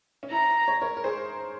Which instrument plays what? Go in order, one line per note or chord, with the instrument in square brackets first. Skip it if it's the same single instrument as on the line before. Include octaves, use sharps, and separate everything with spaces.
[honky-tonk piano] C#4
[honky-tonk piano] E4 [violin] A#5
[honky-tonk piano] C#5
A#4 C#5
A#4
G#4 C5